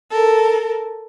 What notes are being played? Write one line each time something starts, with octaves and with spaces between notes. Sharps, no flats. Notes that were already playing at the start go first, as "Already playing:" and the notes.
A4 A#4